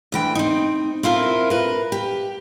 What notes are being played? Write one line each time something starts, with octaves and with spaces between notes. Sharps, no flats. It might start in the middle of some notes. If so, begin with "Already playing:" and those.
D2 E3 G5
C4 D#4
C4 E4 F4 A#4
A#4 B4
G4